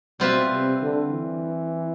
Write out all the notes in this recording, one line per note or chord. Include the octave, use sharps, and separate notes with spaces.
B2 G3 C4 F4 B4 E5
C3
D3
E3